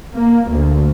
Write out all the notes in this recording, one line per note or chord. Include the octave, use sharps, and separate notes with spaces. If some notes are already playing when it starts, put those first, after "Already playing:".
A#3
D2